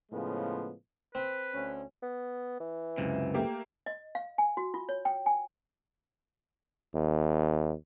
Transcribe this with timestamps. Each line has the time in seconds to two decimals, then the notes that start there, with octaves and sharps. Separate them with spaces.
0.11 A2 C#3 F3 G#3 B3
1.15 C4 B4
1.54 D2 C#4
2.02 B3
2.60 E3
2.98 C#2 F#2 C3
3.34 A3 A#3 G4
3.86 D#5
4.15 F5
4.38 G#5
4.57 F#4
4.74 F4
4.89 C#5
5.05 G5
5.26 G#5
6.95 D#2